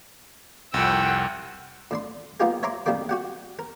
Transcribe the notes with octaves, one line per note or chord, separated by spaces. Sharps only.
C2 F2 F#5 G5 E6
A2 D4 C6
A#3 B3 D#4 F4 G4 G#4
C#5 E5 A#5 C6 D6
C2 D#3 G3 A3 A#3 D6
F#4 G4 F#5
A#4